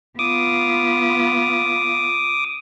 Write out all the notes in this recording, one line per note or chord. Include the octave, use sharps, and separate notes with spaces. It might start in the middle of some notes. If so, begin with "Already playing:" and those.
B3 F4 D6 D#6